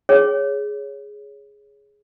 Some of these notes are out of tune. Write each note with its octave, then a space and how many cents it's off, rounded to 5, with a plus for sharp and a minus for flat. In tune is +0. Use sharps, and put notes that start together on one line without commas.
G#4 +0 C#5 +0